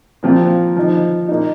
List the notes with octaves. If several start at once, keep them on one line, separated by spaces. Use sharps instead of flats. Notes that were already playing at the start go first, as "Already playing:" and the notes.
A#2 F3 C4 F4
F3 D#4
A#2 A#3 D#4